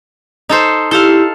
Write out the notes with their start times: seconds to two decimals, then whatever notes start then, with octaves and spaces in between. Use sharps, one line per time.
0.49 D#4 A4 C5
0.91 E4 G4 A4 F5